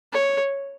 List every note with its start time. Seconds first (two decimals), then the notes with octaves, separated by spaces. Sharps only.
0.13 C#5